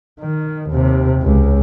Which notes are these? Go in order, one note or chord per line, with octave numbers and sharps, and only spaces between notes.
D#3
D#2 C3
C#2